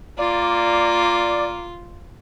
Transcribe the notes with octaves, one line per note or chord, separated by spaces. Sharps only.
A#3 F4 D5